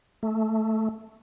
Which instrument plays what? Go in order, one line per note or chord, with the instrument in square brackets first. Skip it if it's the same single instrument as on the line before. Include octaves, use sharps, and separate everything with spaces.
[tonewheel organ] A3